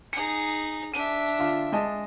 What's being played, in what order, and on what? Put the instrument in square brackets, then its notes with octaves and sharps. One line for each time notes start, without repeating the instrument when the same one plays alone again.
[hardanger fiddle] D#4 G#4 [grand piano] C#7
[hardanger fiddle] D4 E5 [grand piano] D#7
[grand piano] D3 F4
G#3 D#5 A5